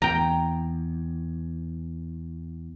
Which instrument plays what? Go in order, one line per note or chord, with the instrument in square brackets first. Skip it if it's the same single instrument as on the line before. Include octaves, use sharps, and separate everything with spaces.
[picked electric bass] E2 [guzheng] G5 A#5